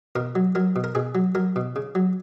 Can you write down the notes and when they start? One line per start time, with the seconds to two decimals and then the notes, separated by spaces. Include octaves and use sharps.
0.16 B2 A#4
0.35 F#3
0.55 F#3 A#4
0.76 B2
0.84 A#4
0.95 B2 G#4
1.15 F#3
1.35 F#3 A#4
1.56 B2
1.76 C#3
1.95 F#3